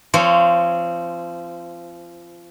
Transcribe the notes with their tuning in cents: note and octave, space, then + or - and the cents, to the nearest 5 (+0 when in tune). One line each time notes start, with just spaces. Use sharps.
F3 -25 C4 +0 C#5 +0